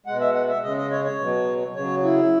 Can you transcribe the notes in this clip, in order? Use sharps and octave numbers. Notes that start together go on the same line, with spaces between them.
B2 G#3 F#5
E5
F#5
E5
C#3 G#3 D#5
D#5
C#5
C#5
B2 F#3
C#3 F#3 C#5
E4